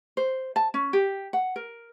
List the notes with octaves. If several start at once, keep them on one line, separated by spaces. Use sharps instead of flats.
C5
A5
C#4
G4
F#5
A#4